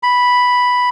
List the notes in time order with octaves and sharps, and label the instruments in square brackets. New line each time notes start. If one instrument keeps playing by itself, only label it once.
[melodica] B5